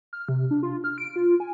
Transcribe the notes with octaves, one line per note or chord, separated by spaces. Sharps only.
F6
C3
D4
F4
F6
D7
F4
G#5